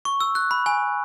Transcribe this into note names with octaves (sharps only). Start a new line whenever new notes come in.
C#6
E6
F#6
B5
G#5